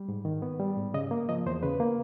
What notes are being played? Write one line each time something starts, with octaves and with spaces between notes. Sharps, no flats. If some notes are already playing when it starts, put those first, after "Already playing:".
Already playing: G3
G#2
D#3
B3
G3
G#2
C#3 D#5
A#3
F3 D#5
E2 C5
C#3 B4
A#3